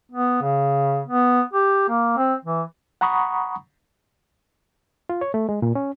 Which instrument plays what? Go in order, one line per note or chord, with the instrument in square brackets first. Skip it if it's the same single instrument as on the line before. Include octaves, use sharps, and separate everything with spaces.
[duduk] B3
C#3
B3
G4
A#3
C4
E3
[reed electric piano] F#5 A#5 B5 C#6 D#6
F4
C#5
A3
G#3
A#2
C#4